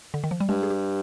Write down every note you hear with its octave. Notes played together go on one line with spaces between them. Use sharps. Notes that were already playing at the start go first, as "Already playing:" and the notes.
D3
D#3
F3
G3
G2 G#3
G#4
G4